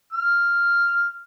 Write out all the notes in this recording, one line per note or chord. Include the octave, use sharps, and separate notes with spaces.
F6